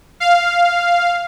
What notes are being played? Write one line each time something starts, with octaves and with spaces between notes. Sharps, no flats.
F5